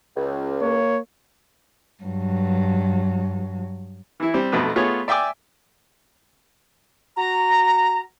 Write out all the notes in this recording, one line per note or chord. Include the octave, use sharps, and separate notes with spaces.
C#2
A#3 C#5
G2 F#3
E3 E4
G3 C4
B1 F2 B2 A3 B4
A3 B3 F4 G#4 C#5
D5 E5 G5 G#5 D6
F#4 A#5